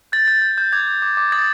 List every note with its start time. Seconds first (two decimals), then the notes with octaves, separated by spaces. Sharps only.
0.12 G6 A6
0.28 G6 A6
0.42 G6
0.58 G6
0.72 D6 G#6
0.87 G6
1.02 D6
1.17 D6
1.32 D#6 A6